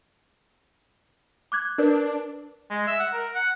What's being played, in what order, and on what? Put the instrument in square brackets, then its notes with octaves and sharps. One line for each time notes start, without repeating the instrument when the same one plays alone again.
[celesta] D6 F#6 G#6
[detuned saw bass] D4 [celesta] A#4 B4 D5
[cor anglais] G#3
E5
F#5
A#4
F#5